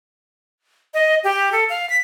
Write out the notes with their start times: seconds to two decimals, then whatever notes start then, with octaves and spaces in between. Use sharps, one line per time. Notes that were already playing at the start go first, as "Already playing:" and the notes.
0.94 D#5
1.24 G4
1.52 A4
1.69 F5
1.90 B6